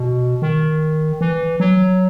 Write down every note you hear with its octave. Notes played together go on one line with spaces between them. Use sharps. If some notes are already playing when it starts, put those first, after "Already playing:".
Already playing: B2
D#3
E3
F#3